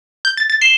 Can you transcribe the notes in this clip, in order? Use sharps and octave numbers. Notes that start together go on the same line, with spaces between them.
G6
A6
A6
C7 E7 G7